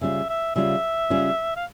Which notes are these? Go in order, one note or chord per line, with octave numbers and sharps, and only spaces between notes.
C#3 G3 C#4 F4 E5
E5
C#3 G3 C#4 F4 E5
C#3 G3 C#4 F4
F5